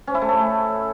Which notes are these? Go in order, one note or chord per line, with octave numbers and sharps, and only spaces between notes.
C#4
E4
A3
A4